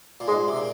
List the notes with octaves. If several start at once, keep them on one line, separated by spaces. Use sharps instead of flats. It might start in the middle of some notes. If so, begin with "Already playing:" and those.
A#2
G#2 G#3
C3
A#2